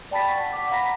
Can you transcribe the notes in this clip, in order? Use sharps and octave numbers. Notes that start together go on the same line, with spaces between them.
D5 G5 A5 B5 A6 B6
F#5 C#6 A6 B6
F#5 D6
F5 F#5 A#5 B5 A#6 B6